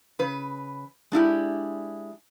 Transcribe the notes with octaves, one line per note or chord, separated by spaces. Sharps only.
C#3 B4
G#3 D4 E4 G4